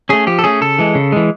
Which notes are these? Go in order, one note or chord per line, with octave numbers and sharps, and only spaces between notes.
A3 C#4 G#4
F3 G4
A4
A3 C#4 G#4
C#3 A4
E3 G#3
C#3
E3 G#3